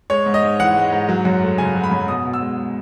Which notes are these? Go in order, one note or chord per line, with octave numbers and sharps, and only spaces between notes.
G#3 C#5
G#2
D#5
G#2
E3 F#5
G#3
G#2
F#3
F#2
A3
C#3 G#5
F#3
B5
F#2
B2 D#6
B2
E6
G#3
G#3